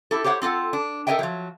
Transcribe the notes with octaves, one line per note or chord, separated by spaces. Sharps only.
E4 G4 A4
G4 C5 C#5 F5 F#5
C4 F4 A4 F#5
D4
A4 A#4 C#5 D#5 E5 G5
F3 F#3